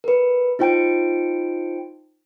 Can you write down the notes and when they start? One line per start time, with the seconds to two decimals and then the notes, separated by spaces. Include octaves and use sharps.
0.04 A#4 B4
0.59 D#4 F4 C5 G5 A5 D7